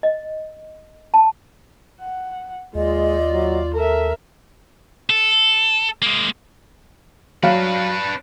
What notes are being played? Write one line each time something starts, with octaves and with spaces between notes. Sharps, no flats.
D#5
A5
F#5
D#2 G#3 F4 D5 D#5
F#3
A4 A#4 E5
A4
G#3 A#3
F#3 D4 B4 F5